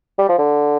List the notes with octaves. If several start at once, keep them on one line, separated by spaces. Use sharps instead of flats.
G3
F3
D3